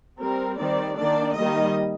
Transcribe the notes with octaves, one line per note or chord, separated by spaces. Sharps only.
G3 C4 A#4
D#3 G3 C4 D5
D#3 A#3 D4 D5
D#3 G3 A#3 D#5